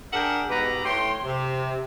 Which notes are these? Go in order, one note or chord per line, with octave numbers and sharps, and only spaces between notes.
D4 G#4 A#4 E5 F#5 G5
G#2 B2 B3 G4 B4 A#5
A2 A3 C#5 G5 C6
C3